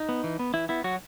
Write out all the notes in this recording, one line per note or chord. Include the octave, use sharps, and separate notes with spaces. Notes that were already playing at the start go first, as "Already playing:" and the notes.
Already playing: D#4
B3
E3
B3
E3 E4
B3 E4
F#3 F#4